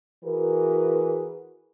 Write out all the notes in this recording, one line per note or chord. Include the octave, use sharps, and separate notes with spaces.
E3 F#4 G#4 A#4 B4